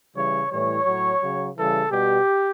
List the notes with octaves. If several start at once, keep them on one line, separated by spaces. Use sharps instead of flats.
C#3 E3 G3 C#5
A2 E3 G3 C#5
A2 F#3
C#3 F#3
C#3 E3 G3 A4
B2 G3 G4